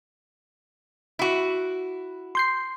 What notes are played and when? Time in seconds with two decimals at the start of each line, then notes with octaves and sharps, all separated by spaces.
1.19 E4 F#4
2.35 C6 G6 C7